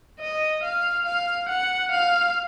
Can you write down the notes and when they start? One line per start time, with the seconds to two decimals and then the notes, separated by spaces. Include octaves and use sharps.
0.20 D#5
0.64 F5
1.06 F5
1.49 F#5
1.91 F5